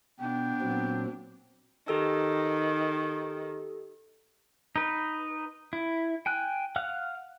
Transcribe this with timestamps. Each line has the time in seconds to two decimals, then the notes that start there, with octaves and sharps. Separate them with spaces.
0.20 B2 B3 D4 G5
0.61 A#2 F#3 C4
1.88 D#3 G4 A4 E6
4.76 D#4 B4
5.73 E4
6.26 G5 G#5 F#6
6.76 F5 F#5 F6 F#6